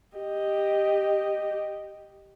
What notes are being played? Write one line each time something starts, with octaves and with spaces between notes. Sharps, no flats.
G4 D#5